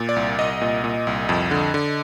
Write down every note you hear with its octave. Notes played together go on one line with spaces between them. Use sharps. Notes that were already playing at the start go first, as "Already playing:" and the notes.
Already playing: A#2
D5
C2
C2 D#5
A#2
A#2
C2
F2
D3
D3